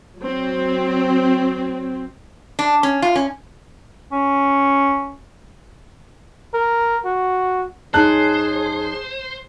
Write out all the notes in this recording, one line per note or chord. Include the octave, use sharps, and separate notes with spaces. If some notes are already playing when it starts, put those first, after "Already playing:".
F#3 C4
D4
C#4
F4
C#4
C#4
A#4
F#4
F#2 D#4 G#4 C5 C#5 A5 F#6